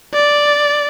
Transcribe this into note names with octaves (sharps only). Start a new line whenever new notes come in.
D5